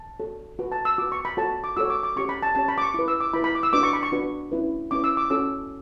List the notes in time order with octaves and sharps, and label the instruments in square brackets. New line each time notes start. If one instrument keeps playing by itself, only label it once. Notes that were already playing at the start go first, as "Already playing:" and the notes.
Already playing: [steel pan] A5
F#4 A4 C#5
F#4 B4
A5
E6
F#4 B4 D6
C#6
B5
F#4 A4 C#5 A5
D6
F#4 A4 C#5 E6
D6
D6
C#4 G4 C#5 C#6
B5
A5
C#4 G4 C#5 A5
B5
D6
C#6
E4 D6
B4
E6
D6
E4 B4 B5
B5
D6
E6
D4 F#4 B4 D6
C#6
B5
C#6
D4 F#4 B4
C#4 E4 B4
C#4 E4 B4 D6
E6
D6
C#4 F#4 A4 C#5 E6